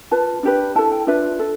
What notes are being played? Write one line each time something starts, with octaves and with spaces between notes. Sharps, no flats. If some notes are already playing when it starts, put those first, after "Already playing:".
F4 B4 A5
D4 G4 B4
E4 A4 A5
G5
D4 F4 B4 E5
A4